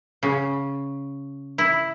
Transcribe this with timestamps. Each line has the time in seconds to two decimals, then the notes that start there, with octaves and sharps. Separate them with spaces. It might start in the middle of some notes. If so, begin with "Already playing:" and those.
0.23 C#3
1.58 E4